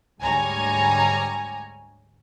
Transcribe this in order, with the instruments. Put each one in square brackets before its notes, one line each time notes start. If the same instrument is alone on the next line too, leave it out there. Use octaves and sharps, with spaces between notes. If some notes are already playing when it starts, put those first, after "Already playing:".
[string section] D2 G#2 G3 C#5 G#5 A#5